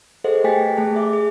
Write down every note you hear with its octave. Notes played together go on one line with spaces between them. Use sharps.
G#4 A4 B4 C5 D#5 F#5
A3 G4 G5 G#5 A6 B6
A3 G#4 A5
E5 D6
G#4